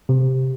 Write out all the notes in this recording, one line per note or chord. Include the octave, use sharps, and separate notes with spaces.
C3